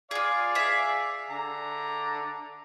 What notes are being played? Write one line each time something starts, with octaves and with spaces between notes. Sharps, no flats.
F4 G#4 D5 F5
G#4 E5
D3 A#5